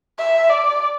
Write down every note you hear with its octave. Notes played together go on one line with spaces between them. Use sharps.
E5
D5